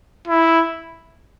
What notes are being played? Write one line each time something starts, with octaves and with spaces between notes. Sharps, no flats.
E4